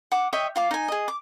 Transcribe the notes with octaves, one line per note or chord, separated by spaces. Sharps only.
F#5 D6
C#5 D#5 E5 G5
F4 F5 D6
D#4 G#5
G#4 D#5
D6